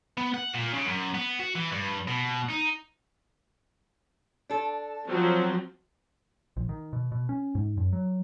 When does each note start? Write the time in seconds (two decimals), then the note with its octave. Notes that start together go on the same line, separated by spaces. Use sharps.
0.18 B3
0.34 F#5
0.54 A#2
0.74 C#3
0.86 F#2
1.15 B3
1.40 F#4
1.55 E3
1.72 G2
2.08 B2
2.50 D#4
4.50 D4 A4
5.09 F3 F#3 C4
6.57 A#1
6.69 D#3
6.93 B2
7.12 B2
7.29 C#4
7.55 G#2
7.77 F#2
7.93 F#3